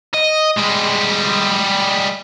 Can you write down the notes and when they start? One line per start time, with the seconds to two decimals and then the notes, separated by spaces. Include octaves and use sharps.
0.14 D#5
0.57 G3 G#3